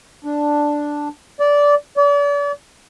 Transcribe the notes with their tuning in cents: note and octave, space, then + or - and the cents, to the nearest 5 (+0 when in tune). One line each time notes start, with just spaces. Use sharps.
D4 +0
D5 -15
D5 -40